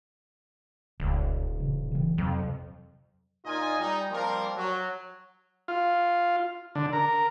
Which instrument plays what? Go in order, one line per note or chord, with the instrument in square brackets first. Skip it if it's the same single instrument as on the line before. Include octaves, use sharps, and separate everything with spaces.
[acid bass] D#1 [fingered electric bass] C#2
[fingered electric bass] A1 C#3
C#3 E3
[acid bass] F2 [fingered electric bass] C3 F#3
[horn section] A#2 D#4 F4 D#5 G#5
G3 D#4
F3 G3 A#3 C4 F4 A#4
F#3
[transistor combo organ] F4
D3
A#4